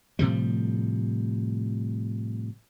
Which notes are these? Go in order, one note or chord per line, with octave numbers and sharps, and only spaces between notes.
A2 C3 F3 G3